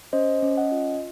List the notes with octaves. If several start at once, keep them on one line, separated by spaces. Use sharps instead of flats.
C#4 C5 D#5
C#4
D#5 F#5
F4